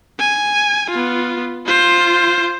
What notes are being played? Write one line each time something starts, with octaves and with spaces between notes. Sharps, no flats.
G#5
B3 F4
F4 C5